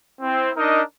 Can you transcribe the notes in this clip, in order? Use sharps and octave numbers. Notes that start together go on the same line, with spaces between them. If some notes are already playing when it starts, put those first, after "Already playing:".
C4 E4
D4 D#4 A#4 D#5